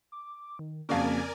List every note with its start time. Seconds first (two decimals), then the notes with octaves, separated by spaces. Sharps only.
0.12 D6
0.59 D#3
0.89 F2 C#3 A#3 F#4 A#4 D5 F5 G#5